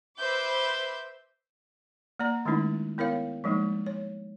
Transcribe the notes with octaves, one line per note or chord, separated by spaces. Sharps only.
B4 C5 E5 D6 G6
A#3 D5 A#5
D#3 G#3 A3 C#4 D#4 E4
B3 E4 A#4 C#5 F5
F3 G3 G#3 A#3 D#4
C#5